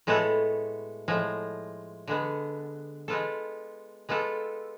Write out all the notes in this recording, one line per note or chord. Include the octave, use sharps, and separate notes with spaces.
A2 G#3 B3 F#4 A4
A2 F3 G#3
D3 G#3 B3
G#3 B3 F4 A4
G#3 B3 F4 A4